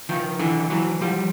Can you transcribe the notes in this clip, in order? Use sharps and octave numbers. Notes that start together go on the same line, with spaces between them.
D#3 F3
D3 E3
E3 F#3
F3 G3